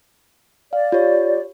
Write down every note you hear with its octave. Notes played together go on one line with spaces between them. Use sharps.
D5 F5
F4 G4 C#5